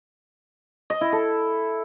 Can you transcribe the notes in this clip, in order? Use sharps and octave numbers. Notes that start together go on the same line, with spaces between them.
D#5
E4
A4